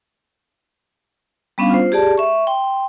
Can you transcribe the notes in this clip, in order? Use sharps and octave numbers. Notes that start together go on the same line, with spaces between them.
G3 B3 C#4 D4 F5
F4 C5
G4 G#4 D5 A5
E5 C#6
G5 C6